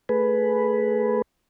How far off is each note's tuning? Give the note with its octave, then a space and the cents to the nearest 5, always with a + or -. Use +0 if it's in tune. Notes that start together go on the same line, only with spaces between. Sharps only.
A3 +10 G#4 +20 B4 +0